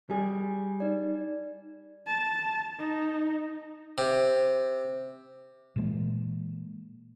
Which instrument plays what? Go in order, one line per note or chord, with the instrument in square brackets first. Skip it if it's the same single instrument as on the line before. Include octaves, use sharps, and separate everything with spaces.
[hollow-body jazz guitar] G3 G#4
[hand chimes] D#4 D5
[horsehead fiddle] A5
D#4
[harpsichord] C3
[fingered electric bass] A#2 E3 G#3 A#3